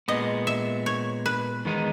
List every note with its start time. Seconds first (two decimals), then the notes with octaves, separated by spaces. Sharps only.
0.08 A#2 G#3 B3 D#5
0.47 E5
0.86 C#5
1.26 B4
1.65 E2 D#3 G#3 B3 D#4